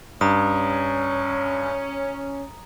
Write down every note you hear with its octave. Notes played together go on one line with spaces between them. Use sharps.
G2 C#4 A#5 D#6